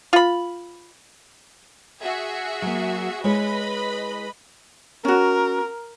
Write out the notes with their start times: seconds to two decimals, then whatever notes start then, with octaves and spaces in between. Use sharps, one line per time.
0.13 F4 B5
2.02 F#4 G#4 E5
2.62 F#3 A#3
3.24 G#3 E4 B4 C#5 D#5 B5
5.05 C#4 F#4 A#4